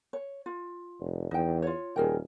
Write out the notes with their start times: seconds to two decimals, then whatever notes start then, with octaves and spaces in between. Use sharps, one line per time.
0.13 C#5
0.46 F4
0.99 F1
1.31 E2 D#4 G5
1.62 F4 C#5
1.96 D#1 G#4 A#4 G5